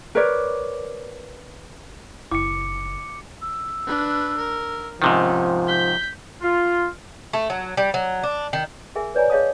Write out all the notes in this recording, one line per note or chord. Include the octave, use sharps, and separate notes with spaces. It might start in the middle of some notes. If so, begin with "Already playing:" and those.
A#4 B4 C#5 D5
F#1 E4 D6 C#7
E6
D4 B4
A#4
G#2 C3 D#3 F3 C#4
G6 B6 G7
F4
A3
F#3
G3
F#3
D4
D#3
G#4 A#4 E5 G#5
B4 C#5 D5 G#5 A#5
G#4 C#5 D#5 F5 A5 D#6